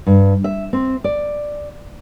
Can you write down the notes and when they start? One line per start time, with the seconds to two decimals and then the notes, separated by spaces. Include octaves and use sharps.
0.07 G2
0.44 E5
0.73 C4
1.04 D5